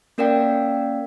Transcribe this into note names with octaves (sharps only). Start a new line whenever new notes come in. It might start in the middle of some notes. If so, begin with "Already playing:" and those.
A#3 C#4 A#4 D5 F5 G5